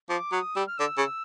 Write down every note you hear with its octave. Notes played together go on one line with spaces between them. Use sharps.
F3 D6
F#3 D#6
G3 E6
F6
D3 E6
C#3